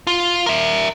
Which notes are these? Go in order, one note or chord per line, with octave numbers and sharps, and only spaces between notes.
F4
A#4 E5